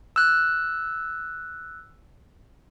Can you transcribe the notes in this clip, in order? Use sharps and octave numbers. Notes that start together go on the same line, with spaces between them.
E6 F#6